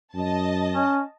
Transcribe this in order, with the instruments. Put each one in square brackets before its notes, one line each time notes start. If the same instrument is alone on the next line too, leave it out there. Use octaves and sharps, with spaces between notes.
[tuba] F#2 [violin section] D#5 A5
[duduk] C#4